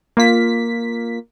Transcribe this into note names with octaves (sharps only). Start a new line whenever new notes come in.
A#3 F4 B6